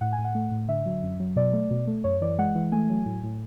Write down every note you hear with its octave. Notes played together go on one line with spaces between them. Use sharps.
A2 F#5
G#5
A2
F#5
A3
A2
D3 E5
F#3
F#2
F#3
B2 D5
A3
B2
A3
F#2 C#5
E3 D5
G#3 F#5
E3
A3 G#5
F#3
A2
A2